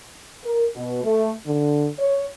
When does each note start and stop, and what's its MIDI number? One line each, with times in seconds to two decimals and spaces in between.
0.45 0.65 70
0.76 1.04 47
1.04 1.32 57
1.46 1.87 50
1.99 2.25 73